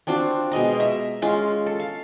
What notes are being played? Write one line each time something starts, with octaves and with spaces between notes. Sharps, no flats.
C4 D4 F4 F#4
B2 G#3 D#5 A#5
E5 A#5
G#3 C#4 F4
A4
F5